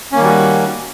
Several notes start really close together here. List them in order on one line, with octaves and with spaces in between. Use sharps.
C#4 A#3 D#3 G3 F#4